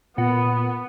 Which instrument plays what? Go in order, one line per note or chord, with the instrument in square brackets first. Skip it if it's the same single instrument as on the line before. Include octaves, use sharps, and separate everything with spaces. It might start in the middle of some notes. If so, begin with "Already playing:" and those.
[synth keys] A#2 F#5 [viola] B3